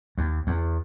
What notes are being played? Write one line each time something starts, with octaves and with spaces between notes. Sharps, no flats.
D#2
E2